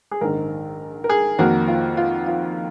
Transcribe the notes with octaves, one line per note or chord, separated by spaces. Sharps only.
G#4
A#1 G#2 D#3 A#4
A#4
G#4
F2 D#3 A#3 F#4
F4
F4
F4